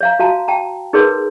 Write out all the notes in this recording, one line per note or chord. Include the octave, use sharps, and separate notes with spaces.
C#5 F5 A#5
F#4 F5 A5 A#5
G5 A5 A#5
D#4 G#4 A#4 B4 C#5 C6